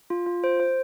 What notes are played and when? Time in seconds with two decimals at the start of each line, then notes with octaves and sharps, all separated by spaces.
0.10 F4
0.26 F4
0.44 C5
0.60 C5